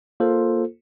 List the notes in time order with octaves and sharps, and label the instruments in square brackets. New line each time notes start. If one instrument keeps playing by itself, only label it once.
[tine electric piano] A#3 F4 A4 C5